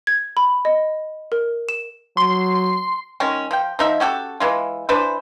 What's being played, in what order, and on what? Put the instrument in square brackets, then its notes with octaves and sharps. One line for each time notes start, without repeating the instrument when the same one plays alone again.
[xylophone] G#6
B5
D#5
A#4
E7
[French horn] F#3 [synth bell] C6
[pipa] D#3 G#3 C#4
F3 G5
F3 D#4 E5
C#4 F#4 G4 A4
E3 G#3 F4
E3 D4 B4 C5